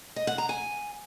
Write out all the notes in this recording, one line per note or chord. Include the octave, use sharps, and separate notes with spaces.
D#5
F#5
A#5
G#5